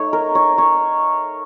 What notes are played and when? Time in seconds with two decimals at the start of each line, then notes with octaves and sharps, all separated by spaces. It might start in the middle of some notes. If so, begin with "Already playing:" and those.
Already playing: A3 D#4 C#5
0.13 A#4
0.35 C#5
0.58 C#5